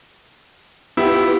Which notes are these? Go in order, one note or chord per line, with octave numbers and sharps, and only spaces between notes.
B3 E4 F4 G4